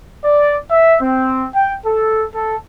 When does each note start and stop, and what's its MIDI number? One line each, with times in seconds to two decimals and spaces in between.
0.23 0.57 74
0.71 0.96 76
1.02 1.46 60
1.54 1.75 79
1.85 2.24 69
2.34 2.55 69